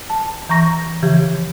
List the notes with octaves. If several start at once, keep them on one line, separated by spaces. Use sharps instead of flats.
A5
E3 A#5 C#6 A#6
C#3 E3 F3 G4